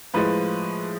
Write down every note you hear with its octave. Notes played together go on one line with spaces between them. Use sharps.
A2 F3 G#3 B4